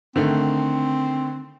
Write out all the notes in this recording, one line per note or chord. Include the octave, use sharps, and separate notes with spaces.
D3 D#3 A3 C4